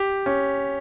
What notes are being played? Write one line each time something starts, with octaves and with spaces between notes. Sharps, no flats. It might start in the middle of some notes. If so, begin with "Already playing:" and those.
Already playing: G4
C#4